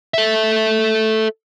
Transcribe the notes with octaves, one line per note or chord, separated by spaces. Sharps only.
A4 E5